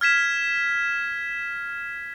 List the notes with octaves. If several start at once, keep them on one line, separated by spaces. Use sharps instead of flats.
F6 G#6 B6 E7